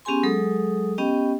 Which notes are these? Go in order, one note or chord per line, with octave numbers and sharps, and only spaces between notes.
B3 C#4 G4 G#4 G#5 C6
F#3 G#3 G#4 A4 D#6
B3 C#4 G4 D#5 G5